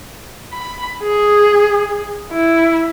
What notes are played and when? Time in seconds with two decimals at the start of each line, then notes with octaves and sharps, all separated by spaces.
0.53 B5
1.03 G#4
2.31 E4